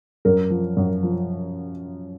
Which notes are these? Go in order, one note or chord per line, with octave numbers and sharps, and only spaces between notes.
F#2 A#4
F3
F#2
F3